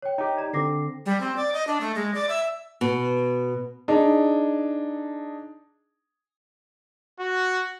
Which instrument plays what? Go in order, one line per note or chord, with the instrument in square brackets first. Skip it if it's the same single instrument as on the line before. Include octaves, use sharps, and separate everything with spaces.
[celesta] C#5 G5
[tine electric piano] D#4 G4
[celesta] D5 A#5
[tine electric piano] D3 C4 [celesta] D6 A#6 C7
[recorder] G3
C4
D5
D#5
D4
A3
G#3
D5
E5
[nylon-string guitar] B2
[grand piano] D4 D#4 G#4
[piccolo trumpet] F#4